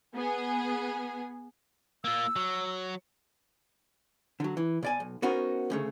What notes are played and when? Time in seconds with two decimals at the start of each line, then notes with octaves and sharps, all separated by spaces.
0.14 B3 G#4
2.04 A#3 F4 E6
2.36 F#3
4.40 D3 F#3
4.57 E3
4.83 B2 D5 G#5
5.00 B1
5.22 B3 C#4 D#4 F#4 A#4 C5
5.70 D2 C#3 A3